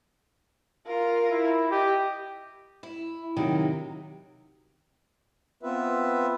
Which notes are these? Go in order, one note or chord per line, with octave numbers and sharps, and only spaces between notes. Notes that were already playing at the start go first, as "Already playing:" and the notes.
F4 A#4
E4
G4 D#5
E4
C3 D#3 F#3 E4
B3 C4 F4 B4 E5